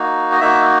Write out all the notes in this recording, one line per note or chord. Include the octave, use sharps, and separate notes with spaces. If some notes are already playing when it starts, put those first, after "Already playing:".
Already playing: A#3 D#4 F#4
D#5
A#3 D#4 F#4 E5